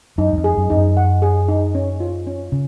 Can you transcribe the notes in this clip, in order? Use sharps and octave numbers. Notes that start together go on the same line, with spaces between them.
F#2 D#4
F#2
F2
G#4
F#2
F2 D#4
F#2
F#5
G#4
D#4
C#4
F4
C#4
C#3